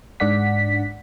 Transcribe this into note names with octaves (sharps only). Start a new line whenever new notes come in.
G#2 D4 D5 F#5 B6